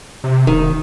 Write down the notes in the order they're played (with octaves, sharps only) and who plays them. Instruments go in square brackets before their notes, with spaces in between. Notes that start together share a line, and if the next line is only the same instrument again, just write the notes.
[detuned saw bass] C3
[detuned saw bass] E1 [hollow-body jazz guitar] D#3